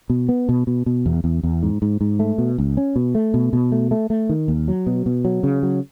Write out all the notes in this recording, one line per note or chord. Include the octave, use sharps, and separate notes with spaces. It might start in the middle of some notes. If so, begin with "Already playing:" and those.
B2
B3
B2
B2
B2
E2
E2
E2
G#2
G#2
G#2
A3
B2
C#2
C#4
B2
A3
B2
B2
A3
A3
A3
D#3
D#2
F#3
B2
B2
F#3
C#3
F#3